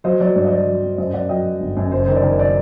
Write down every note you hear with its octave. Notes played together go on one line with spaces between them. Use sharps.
F#3 C5 D#5
F#3 D5
G2 D5
D#5
F#3 D5
F#3
C4
F#2 C5 D#5
F#2 D5 F#5
F#3 D#5 G5
F#3
G1
F#2
F#1 C5
D#3 C5
D5
D#3
D5